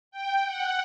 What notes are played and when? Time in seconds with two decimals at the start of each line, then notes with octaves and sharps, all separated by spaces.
0.11 G5
0.45 F#5